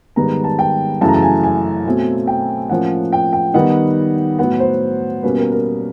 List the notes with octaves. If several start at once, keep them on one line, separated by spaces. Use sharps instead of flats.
G#2 D#3 G3 B3 A#5
A5
G5
F#2 C#3 E3 A3 A5
A#5
A5
G#5
G#5
B2 F#3 A3 C4
G5
A2 F3 A#3 C#4 F#5
G5
G5
D#3 G3 B3 D#4 F#5
A2 F#3 B3 F#5
C5
B2 G3 A#3 C#4 B4
A#4
A#4